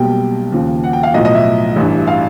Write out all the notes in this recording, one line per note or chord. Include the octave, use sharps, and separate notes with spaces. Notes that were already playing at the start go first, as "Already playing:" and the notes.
Already playing: B1 B2 G3 A#3 G5
D#2 C#3 F3
F#5
G5
F5
B1 A2 F3 D#5
D#5
E5
A1 G2 E3
F5